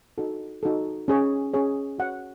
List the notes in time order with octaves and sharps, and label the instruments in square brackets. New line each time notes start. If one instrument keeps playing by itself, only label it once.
[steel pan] D#4 F#4 A4
D#4 F#4 A4
C#4 G#4 C#5
C#4 G#4 C#5
F#4 C#5 F#5